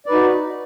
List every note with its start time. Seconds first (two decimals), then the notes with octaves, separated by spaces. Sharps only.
0.06 D5
0.09 B4
0.11 D#4
0.14 F#4